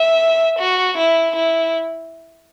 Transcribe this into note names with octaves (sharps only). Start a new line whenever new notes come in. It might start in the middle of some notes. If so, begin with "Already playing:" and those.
Already playing: E5
F#4
E4
E4